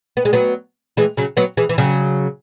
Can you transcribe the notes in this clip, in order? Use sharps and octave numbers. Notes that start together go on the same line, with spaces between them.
B3
G#3
F#3 B3
E3 G#3
C#3 F#3
F#3 B3
E3 G#3
E3
C#3 F#3